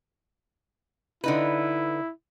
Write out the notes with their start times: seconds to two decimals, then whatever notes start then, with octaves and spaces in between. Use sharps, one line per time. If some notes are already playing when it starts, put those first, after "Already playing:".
1.24 D3 D#4 E4 B4